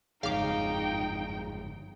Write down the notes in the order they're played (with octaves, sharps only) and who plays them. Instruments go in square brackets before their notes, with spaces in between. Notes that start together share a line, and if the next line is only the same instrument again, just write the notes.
[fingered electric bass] G1 F2 G#2 [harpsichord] C#3 [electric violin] D#4 G5 [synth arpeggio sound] F5 D6